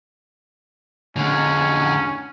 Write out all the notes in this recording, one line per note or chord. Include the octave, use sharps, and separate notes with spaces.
D3 G#3 C#4